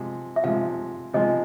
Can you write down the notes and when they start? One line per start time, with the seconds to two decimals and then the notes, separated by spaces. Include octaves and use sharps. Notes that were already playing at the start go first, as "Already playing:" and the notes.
Already playing: C3 F3 G#3
0.36 E5
0.44 C3 F3 G#3 F5
1.13 C3 F3 G#3 D#5